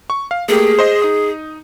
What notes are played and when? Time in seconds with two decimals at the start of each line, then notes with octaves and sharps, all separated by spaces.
0.10 C#6
0.31 F5
0.48 A3 A#3 G4 G#4
0.79 C5 D#5 C6
1.02 D#4 D#6